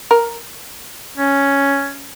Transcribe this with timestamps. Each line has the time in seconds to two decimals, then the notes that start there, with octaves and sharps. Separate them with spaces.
0.11 A#4
1.18 C#4